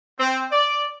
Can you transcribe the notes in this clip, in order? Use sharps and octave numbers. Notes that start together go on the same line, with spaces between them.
C4
D5